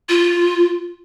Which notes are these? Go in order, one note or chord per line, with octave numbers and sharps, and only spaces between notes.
F4